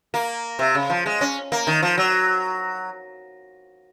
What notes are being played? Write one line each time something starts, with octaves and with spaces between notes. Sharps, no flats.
A#3
C3
C#3
F3
G#3
C#4
A#3
D#3
F3
F#3